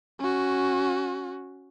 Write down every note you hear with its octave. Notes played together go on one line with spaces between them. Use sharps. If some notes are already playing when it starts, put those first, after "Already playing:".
C#4 F#4